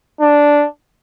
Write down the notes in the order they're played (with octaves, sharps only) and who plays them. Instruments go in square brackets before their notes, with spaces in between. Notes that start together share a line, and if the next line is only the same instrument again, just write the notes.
[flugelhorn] D4